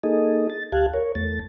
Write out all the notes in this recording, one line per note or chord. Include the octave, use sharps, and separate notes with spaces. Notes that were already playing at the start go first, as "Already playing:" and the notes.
A#3 D#4 G#4 A4 D#5
A6
D2 G4 F5 A5 F#6 G#6
A#4 C#5
E2 A3 A6